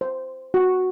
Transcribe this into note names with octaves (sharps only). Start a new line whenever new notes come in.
C5
F#4